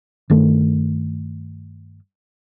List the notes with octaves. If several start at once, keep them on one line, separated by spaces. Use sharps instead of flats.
G2 D#3 A3